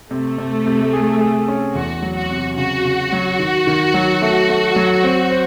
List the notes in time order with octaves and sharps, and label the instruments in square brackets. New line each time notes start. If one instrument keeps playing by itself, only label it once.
[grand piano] C3 [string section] A3
[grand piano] C3
C3
G#4
G#4
C#4
[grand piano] E2 [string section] F#4
[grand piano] F#3
[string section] F#4
[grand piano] C3
[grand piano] C#3 [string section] F#4
[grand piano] C#3
F#3
D#3
D#3
F#3
A3
A3
F#3
C4
C5